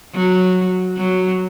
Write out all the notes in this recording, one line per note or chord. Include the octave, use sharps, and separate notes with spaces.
F#3
F#3